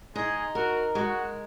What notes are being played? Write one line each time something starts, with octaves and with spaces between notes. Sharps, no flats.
G#3 D#4 G#4
F#4 A#4
G#3 F#4